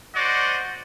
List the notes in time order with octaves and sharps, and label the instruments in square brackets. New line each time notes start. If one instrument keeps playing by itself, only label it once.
[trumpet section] F#4 C5 D5 D#5 F#5